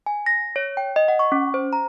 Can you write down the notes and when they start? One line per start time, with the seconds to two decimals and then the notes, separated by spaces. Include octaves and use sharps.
0.06 G#5
0.26 A#6
0.56 C#5
0.77 G5
0.96 D#5
1.08 F#5
1.19 C#6
1.32 C#4
1.54 C5
1.73 A#5